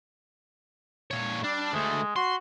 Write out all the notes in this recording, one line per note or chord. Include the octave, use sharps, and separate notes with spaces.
A#2 C#5
G3 D4
D2 G#3 A3
F#4 C6